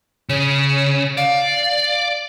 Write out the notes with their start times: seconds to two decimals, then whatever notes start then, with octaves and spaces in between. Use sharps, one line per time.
0.29 C#3 C#5
1.17 D5 F5